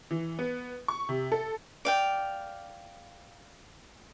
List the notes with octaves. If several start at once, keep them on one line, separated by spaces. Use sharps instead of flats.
E3
B3
C#6
C3
A4
D5 F5 G5